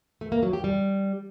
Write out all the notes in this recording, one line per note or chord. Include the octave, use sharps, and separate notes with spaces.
A3
A#3
F#3
G4
G3